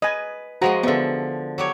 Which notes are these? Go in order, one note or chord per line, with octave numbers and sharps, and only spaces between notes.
B4 D#5 G#5
F3 G#3 F#4 D#5 A#5
D3 F3 B3 E5
F#3 G4 C#5